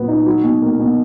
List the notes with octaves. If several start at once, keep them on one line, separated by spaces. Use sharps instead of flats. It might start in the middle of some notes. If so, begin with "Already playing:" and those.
Already playing: A#2 F#3 B3
D#4
F#3
B2
A#3
B2